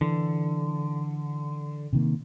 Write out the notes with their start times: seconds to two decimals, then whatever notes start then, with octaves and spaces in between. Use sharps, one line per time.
0.01 D3 E3
1.93 C3 D#3 A#3